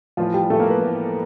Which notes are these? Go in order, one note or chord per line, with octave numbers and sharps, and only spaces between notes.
A2 E3 F3 F4
G3 G4
A2 E3 A3 A4
A#3 A#4
B3 B4
A2 E3